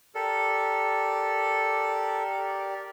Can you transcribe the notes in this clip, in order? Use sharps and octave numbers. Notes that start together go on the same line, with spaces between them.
G4 A4 A#4 D5